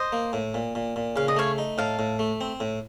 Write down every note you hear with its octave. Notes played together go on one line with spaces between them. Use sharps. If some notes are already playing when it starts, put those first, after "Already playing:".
Already playing: C5 D#5
A#3
A2
A#2
A#2
A#2
C#3 F5
D#5
A3 C#5 F5
D#4
A2 F5 A5
A2
A3
C4
A2